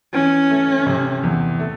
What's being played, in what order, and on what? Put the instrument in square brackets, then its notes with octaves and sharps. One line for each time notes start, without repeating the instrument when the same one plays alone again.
[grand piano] E3 [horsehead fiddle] C#4
[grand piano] A3
C3
E2
A3